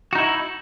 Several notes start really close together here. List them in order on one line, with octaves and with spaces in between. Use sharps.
F#4 D#4 E4